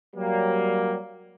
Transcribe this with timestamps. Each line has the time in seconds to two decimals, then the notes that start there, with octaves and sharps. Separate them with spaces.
0.15 F#3 G3 A#3